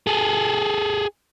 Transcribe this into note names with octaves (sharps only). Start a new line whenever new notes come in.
G#4 A4